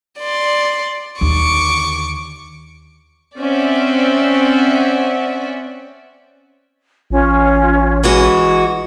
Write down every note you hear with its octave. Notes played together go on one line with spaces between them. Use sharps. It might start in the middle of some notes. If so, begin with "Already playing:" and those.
D5 C6
D#2 D3 C#6 D6
C4 C#4 D5 E5 F#5
A1 C#4 F4
E3 G#3 F#4